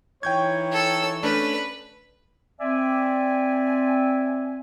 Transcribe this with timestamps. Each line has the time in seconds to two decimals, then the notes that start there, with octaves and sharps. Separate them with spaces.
0.23 E3 D#4 C#5 G5 G6 G#6
0.72 A4 E6
1.23 A3 C#4 D4 B4
2.60 C4 D5 E5 G#5